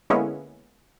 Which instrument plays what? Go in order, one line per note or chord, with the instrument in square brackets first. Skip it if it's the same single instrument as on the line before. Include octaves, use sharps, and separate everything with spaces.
[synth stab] D3 G#3 A#3 B3 C#4 E4